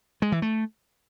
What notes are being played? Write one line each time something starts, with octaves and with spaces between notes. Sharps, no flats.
G#3
E3
A3